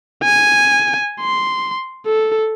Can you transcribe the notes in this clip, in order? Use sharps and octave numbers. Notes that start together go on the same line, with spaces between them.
G#5
C6
A4